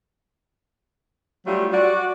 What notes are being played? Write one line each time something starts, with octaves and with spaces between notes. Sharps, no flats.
F#3 G3 A3 D4 F4 G4
F#4 D5